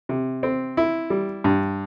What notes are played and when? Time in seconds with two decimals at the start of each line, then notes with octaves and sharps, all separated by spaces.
0.09 C3
0.43 C4
0.77 E4
1.10 G3
1.44 G2